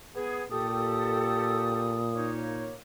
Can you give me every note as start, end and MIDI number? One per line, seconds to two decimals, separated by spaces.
0.15 0.44 59
0.15 0.44 68
0.51 2.75 46
0.51 2.01 67
0.51 2.01 69
0.51 2.31 87
2.13 2.74 58
2.13 2.74 63
2.13 2.74 73